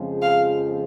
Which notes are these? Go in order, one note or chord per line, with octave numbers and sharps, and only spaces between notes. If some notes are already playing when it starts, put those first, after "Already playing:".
Already playing: F2 C#3 F3 G#3 C4
F5